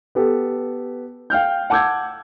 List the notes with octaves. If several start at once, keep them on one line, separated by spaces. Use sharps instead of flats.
B3 G4 A4
F5 G5 F6 G6
F#5 A5 D6 E6 G6 G#6